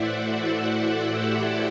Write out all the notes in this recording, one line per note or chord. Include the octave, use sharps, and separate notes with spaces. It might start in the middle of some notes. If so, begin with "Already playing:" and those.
Already playing: A2 E3 C5 D5 E5 F#5
F#4 A4
E4 G4